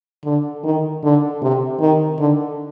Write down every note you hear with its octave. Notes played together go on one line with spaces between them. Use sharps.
D3
D#3
D3
C3
D#3
D3